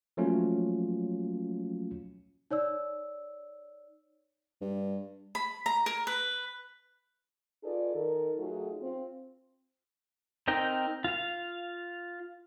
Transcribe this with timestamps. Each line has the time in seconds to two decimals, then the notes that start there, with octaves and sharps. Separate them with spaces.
0.17 F3 F#3 A3 A#3 C#4 F4
2.51 D#4 C#5 D5 E6
4.61 G2
5.35 B5
5.66 A#5
5.86 A#4
6.07 B4
7.64 D#4 F4 G#4 A4 B4 D5
7.94 D#3 A4 A#4
8.38 F#3 A3 D#4 F4 F#4 G#4
8.80 C4 F4
10.48 C4 D#4 A#4 G5
11.04 F4 F5